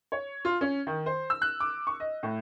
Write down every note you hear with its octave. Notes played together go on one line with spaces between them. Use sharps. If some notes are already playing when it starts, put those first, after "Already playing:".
C#5
F4
C#4
D#3
C5
E6
F#6
D6
C#6
D#5
A2